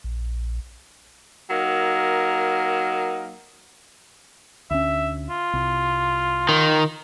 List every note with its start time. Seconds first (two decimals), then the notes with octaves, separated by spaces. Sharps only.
0.04 A#1
1.50 F#3 A#3 D#4 A#4
4.70 D2 C#4 E5
5.30 F4
5.53 C2
6.49 D#3